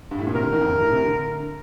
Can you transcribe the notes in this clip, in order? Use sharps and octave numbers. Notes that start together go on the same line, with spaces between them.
G2
A2
A#2
C3 A#4
D3
D#3
F2
G2
A2
C3
D3